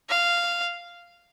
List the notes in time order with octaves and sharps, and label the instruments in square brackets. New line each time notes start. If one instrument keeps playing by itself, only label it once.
[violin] F5